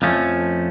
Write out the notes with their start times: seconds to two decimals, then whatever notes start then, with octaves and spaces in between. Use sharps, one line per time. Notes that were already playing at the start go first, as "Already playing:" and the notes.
0.02 F2 F3 A3 C#4